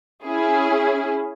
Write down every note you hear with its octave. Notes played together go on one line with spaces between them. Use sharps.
C#4 E4 G#4